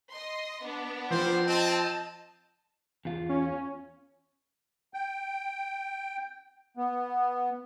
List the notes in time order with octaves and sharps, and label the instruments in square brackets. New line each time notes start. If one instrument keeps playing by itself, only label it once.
[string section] D#5 C6
B3 D4
[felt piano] F3 F4 [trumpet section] C4 C5
[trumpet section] C4 [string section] D#5 A5
[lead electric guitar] E2 F4
[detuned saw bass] C#4
[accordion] G5
B3